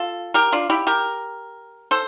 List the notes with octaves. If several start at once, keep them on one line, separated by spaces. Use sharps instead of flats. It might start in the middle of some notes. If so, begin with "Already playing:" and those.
Already playing: F4 A4
G4 A#4
D4 F4
E4 G4
G4 A#4
A4 C5